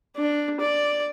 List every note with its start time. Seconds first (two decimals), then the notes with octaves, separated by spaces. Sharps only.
0.17 D4
0.60 D5